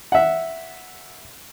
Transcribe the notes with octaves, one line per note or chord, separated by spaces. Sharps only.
E5 F#5